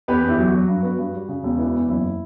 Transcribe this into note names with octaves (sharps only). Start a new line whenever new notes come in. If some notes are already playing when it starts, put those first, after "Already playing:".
E2 G4 B4
E2
E4 G4
F#3
F#4
F#3
G2
B3
G2
G3
C#3
E1
E3
E2
F#1 E4